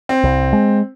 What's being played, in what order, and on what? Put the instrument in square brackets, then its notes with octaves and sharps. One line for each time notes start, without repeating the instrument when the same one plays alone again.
[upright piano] C4
[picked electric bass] C2
G#3